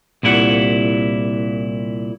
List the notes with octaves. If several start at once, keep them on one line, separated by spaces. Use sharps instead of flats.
C2 A#2 E4 F#5